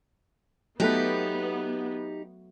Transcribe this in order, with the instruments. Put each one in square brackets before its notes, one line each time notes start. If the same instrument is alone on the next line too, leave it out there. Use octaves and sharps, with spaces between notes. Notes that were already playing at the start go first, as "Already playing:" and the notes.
[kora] F#3 A3 B4 [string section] B3 [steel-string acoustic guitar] D#4 G4